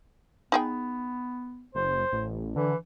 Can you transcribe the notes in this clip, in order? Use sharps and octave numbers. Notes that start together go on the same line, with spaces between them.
B3 D#4 G#4 G5
F#1 C5
A1
D3 E3